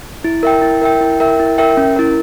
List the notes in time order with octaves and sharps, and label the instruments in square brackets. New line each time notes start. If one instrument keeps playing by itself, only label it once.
[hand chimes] E4
A#4 E5 G5
E4
A#4 E5 G5
E4
A#4 E5 G5
E4
A#4 E5 G5
C#4
E4 A#4